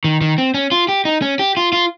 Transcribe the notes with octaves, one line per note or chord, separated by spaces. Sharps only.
D#3
D#3
C4
C#4
F4
G4
D#4
C#4
G4
F4
F4